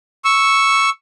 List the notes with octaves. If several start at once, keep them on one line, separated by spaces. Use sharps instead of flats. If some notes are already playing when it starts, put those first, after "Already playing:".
C#6 E6